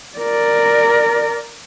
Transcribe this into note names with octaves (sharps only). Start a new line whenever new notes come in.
A#4 D5